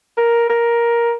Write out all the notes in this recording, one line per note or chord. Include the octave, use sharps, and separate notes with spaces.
A#4
A#4